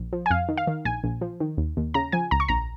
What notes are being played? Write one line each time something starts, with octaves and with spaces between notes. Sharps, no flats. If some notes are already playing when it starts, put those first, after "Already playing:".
Already playing: A#1
F3
G#5
F2 F5
D#3
F5
D#3
A#1 G#5
A#1
F3
D#3
D#2
D#2
C#3 A#5
F3 G#5
C#2 A#5
C#6
A#1 A#5